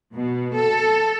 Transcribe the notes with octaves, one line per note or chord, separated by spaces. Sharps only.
B2
A4